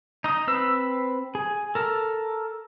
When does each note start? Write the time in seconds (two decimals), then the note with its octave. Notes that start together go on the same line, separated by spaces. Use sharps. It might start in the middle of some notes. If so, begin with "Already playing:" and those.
0.24 D#4 D#6
0.47 C4 B4 E6
1.35 G#4
1.75 A4 A#4